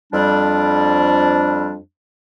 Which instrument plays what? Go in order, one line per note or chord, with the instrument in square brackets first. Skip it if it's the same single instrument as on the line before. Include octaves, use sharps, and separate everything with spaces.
[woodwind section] F2 G3 D4